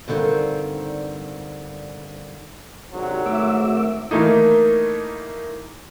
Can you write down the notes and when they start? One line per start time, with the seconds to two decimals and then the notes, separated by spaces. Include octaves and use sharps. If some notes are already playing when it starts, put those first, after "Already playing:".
0.08 G2 D3 D#3 C4
2.93 G#1 C3 F#3 D4
3.26 G#1 G#2 A3 E5 D6 E6
4.11 D#3 E3 A3 A#3 D#4